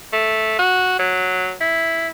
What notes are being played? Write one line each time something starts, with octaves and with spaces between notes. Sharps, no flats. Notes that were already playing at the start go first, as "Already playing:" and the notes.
A3
F#4
F#3
E4